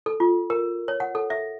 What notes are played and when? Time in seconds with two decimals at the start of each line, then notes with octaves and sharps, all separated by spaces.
0.06 A4
0.20 F4
0.50 A#4
0.88 C#5
1.00 F#5
1.15 A4
1.30 E5